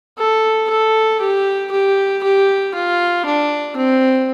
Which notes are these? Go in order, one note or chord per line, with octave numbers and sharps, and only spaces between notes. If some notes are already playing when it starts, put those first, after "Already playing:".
A4
A4
G4
G4
G4
F4
D4
C4